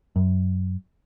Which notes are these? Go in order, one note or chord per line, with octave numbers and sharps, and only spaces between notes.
F#2